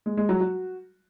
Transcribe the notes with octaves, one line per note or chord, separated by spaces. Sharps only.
G#3
G#3
F#3
F#4